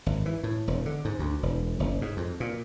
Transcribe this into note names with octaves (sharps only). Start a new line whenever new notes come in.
G#1
E3
A2
E1
D3
G#2
D2
E1
F#1
G#2
F2
A#2